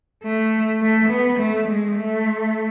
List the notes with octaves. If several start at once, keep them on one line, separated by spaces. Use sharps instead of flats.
A3
A3
B3
A3
G#3
A3